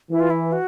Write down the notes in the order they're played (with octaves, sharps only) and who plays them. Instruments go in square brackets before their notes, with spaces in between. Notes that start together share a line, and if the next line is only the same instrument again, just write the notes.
[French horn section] E3 [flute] E4
[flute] F4
E4
F#4